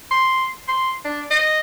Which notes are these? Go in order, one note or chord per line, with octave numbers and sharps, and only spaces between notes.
C6
C6
D4
D#5